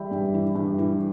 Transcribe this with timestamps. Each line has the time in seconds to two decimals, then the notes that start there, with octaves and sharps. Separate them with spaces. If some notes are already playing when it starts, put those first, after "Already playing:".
Already playing: E3 G3 D5 E5 G5 B5
0.11 G2
0.34 E3
0.56 G2
0.78 E3